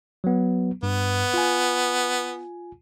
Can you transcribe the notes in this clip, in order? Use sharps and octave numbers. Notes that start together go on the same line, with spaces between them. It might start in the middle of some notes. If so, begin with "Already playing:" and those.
F#3 B3
G2 B3
F4 G#5